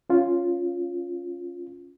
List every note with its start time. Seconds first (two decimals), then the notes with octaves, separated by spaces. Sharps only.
0.10 C#4 F4